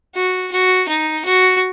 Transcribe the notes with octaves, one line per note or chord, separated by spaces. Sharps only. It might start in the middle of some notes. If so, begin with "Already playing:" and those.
F#4
F#4
D#4
F#4